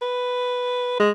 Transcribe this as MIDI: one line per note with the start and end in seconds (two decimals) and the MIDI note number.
0.02 0.96 71
1.00 1.10 56